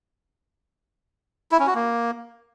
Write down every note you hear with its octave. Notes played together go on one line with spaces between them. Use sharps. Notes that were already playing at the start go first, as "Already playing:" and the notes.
E4
C#4
F#4
A#3